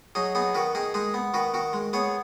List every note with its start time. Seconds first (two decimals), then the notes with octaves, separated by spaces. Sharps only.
0.15 F#3 D#4 G#4
0.35 B3 D#4 G#4
0.54 D#3 F#4 B4
0.75 D#3 D#4 G#4
0.94 G#3 D#4 G#4
1.14 B3
1.34 D#3 F#4 B4
1.54 D#3 F#4
1.73 G#3
1.93 B3 G#4 C#5